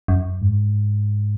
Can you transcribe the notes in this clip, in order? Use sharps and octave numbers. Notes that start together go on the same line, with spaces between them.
F#2
G#2